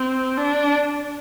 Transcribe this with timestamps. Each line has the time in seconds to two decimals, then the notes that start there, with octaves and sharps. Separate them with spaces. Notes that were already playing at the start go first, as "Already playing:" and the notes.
Already playing: C4
0.37 D4